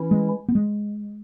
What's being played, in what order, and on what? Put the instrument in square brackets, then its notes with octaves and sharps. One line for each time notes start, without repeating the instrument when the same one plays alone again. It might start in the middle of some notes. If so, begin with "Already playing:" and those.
Already playing: [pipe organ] E3 C#4 E4
[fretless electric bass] G#3
B3
G#3